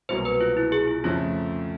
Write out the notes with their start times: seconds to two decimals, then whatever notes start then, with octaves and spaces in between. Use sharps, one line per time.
0.09 C2 B2 F#3 A#3 C5
0.25 B4
0.41 F4
0.57 E4
0.72 G#4
0.87 F4
1.04 F2 C#3 F3 A3 F4